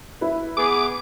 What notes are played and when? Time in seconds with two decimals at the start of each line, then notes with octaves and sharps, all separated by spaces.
0.21 E4 B4
0.57 B3 G#4 D6